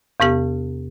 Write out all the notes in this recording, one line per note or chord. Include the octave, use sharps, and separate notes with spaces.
E2 C3 B3 G4